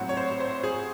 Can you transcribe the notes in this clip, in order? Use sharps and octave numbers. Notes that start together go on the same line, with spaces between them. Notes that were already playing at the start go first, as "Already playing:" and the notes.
Already playing: A2 F#3 C4 F#5
C#5
C5
C5
G#4